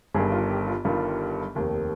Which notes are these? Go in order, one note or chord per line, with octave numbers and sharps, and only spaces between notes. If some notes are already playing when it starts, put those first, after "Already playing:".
G1 G2 D#3 G3 G#4
F4
G4
F4
G1 G2 D#3 G3 F4
F1 D#2 D#3